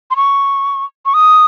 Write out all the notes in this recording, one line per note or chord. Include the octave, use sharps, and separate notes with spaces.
C6
C#6
C#6
D#6